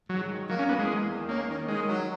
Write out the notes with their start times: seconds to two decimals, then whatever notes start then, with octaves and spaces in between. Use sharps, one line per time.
0.09 G#2 F#3
0.29 D#3
0.48 F#3 A#3
0.59 C#4
0.68 E2 B3
0.79 G#3
0.88 E2
1.09 D#3
1.29 A#3 C#4
1.49 D#3
1.68 D#3 G#3
1.89 F#3